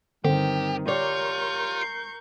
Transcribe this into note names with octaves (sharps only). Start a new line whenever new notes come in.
G2 D3 D#3 C4 G4
F4 G4 A#4 C#5 D5 C#6 G6
C7